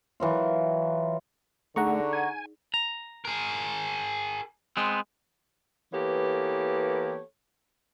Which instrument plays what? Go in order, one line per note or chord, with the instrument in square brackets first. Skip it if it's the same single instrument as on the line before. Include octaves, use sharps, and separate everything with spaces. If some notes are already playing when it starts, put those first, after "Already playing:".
[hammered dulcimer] E3 F#3 F4
[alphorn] D3 [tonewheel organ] A3 [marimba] D#4 G#4 D5 [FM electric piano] F#5 A#5 C#6
[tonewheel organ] G#5
[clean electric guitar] A#5
[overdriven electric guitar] G#4 A#4
[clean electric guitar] G#3 B3 C4
[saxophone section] E3 A#3 B3 G4 A4 C#5